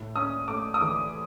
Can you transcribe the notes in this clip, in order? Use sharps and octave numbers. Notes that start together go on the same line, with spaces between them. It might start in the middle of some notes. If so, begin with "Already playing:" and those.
Already playing: A2
C#4 D#6
A3 D6
D#6
E3 D6